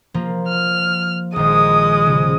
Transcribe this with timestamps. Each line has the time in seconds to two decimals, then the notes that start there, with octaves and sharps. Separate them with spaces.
0.14 F3 A#3 F4
0.48 F6
1.36 A#1 D#3 G#3 C5 D#6
2.06 C#3